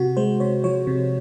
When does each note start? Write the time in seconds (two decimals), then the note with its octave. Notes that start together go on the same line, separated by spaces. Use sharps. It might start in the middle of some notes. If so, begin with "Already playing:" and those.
Already playing: C3 F#4
0.17 G#3 C5
0.40 C3 C#5
0.64 F3 C#5
0.87 C3